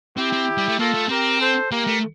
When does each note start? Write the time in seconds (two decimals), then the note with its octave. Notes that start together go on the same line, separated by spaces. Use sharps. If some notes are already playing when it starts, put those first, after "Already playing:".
0.17 C4 E4 G4
0.33 C4
0.58 G3
0.68 A3
0.79 A#3 F4 A4
0.94 A3
1.09 C4 G4 A#4
1.40 A4 C5
1.71 A#3 G4 A#4
1.87 A3